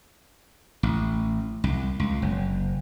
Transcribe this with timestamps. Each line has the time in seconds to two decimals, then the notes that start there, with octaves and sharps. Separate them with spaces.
0.83 A1
1.64 C2
2.00 C#2
2.22 F#1